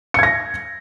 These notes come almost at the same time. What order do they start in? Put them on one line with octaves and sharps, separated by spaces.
C#7 G#6 A#6